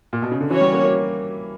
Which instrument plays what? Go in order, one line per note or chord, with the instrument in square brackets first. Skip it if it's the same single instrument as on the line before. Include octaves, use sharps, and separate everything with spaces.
[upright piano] A#2
B2
C#3
D3
[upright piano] E3 [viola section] C#4 F#4 C#5
[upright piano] G3
A#3
A#3